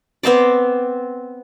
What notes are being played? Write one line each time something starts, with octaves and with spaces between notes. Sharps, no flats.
B3 C4 C5 D5